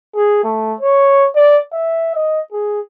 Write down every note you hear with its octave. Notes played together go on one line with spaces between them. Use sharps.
G#4
A3
C#5
D5
E5
D#5
G#4